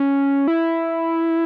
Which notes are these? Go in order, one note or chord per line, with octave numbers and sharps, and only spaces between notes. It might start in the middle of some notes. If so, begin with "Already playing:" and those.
Already playing: C#4
E4